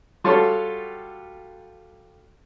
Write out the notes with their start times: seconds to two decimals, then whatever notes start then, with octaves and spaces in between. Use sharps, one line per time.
0.24 G3 F4 F#4 A4 C#5